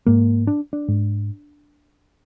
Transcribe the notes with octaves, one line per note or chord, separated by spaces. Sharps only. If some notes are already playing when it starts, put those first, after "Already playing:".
G#2 A#3
D4
D4
G#2